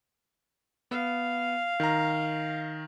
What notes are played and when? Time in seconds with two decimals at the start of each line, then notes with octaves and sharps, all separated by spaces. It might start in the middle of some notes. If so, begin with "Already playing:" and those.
0.91 B3 F5
1.80 D#3 A#5